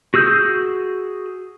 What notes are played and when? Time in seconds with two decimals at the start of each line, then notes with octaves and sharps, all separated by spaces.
0.14 F#4 G#4 E6 G6